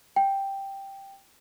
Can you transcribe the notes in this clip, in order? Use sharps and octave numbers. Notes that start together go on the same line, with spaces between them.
G5